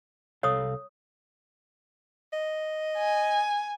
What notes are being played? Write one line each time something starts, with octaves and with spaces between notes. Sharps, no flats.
C2 A4 C#5 F5 D#6
D#5
G#5